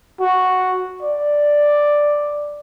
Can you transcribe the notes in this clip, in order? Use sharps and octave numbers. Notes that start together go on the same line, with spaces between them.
F#4
D5